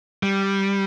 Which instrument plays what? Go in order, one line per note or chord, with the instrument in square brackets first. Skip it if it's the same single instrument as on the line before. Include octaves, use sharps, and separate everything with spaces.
[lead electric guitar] G3